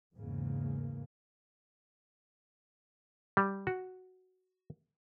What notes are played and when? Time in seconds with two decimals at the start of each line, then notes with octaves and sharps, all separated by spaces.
0.15 E2 G#2 C#3 A#3
3.37 G3
3.67 F#4